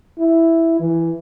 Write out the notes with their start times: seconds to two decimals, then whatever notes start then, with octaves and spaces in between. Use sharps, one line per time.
0.19 E4
0.80 E3